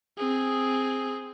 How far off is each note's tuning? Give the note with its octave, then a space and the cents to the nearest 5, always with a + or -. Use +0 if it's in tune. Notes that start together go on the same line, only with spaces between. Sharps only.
C4 +0 G#4 +0